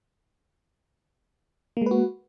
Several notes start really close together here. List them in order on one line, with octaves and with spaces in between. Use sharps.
A#3 G#3 B4 F#4